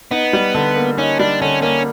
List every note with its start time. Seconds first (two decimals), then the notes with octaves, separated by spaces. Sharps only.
0.11 B3 D#4
0.33 G3
0.55 D3
0.76 A#3
0.98 C#4 D#4
1.19 G3 D4
1.41 D3 C#4
1.62 A#3 C#4